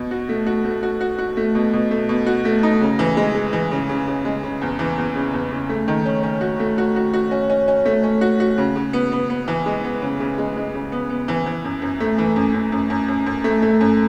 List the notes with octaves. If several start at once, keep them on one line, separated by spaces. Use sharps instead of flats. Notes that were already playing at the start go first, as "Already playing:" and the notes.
Already playing: B2
F#4
A3
F#4
A3
F#4
F#4
F#4
A3
B2
B2
A3
B2
F#4
A3
D#4
C#3
E3
G#3
G#3
E3
C#3
C#3
C#3
G#3
C#3
E2
E3
E2
C#3
E2
C#3
A3
D#3
C#4
C#4
F#4
A3
F#4
F#4
F#4
C#4
C#4
C#4
A3
C#4
F#4
F#4
C#3
C#3
B3
B3
B3
E3
G#3
B3
C#3
C#3
G#3
G#3
C#3
B3
B3
E3
E3
F#2
F#2
A3
E3
F#2
F#2
F#2
F#2
F#2
F#2
A3
A3
F#2